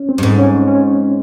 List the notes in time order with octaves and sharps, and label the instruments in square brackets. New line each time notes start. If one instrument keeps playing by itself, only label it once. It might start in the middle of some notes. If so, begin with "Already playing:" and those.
Already playing: [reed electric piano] C#4
C4
[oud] G2
G#2
[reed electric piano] C#4
C#4